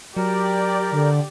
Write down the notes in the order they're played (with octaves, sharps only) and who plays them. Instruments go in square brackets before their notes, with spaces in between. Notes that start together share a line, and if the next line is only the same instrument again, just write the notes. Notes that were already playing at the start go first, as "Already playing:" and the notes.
[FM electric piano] F#3 [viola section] G4 D5 [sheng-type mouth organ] A#4
[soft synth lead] D3